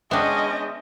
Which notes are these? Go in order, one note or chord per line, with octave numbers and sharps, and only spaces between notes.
G#3 B3 C#4 D4 D#5 E5 G5